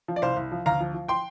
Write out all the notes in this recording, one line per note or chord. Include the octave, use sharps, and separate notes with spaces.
F3
D5
C2 C5 F5
C2
F3
D2 F5 A#5
F3
F3
G5 C6